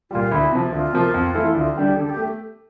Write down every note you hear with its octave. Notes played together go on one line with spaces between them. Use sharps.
A#2 G3 F4
D2 E4
C3 F3
D2 F4
C3 F3 A#3
F2
E3 A3 E4 A4
D2 F4
D3 G3 D4 G4
D3 A4
G4
A3